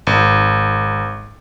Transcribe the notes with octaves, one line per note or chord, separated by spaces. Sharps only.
G#1